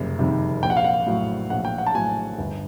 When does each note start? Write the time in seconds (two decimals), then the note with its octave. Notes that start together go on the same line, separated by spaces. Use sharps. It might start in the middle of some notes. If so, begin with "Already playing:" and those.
Already playing: F#1 F2 C3 G3
0.19 F2 C3 D#3 G3
0.63 A#1 G5
0.70 F#5
0.77 F5
0.84 F#5
1.06 A2 F#3
1.50 A#1 F#5
1.65 G5
1.78 F#5
1.87 A5
1.95 A2 F#3 G#5
2.38 G1